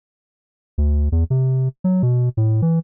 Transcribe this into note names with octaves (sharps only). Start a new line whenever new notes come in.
D2
E2
C3
F#3
B2
A2
E3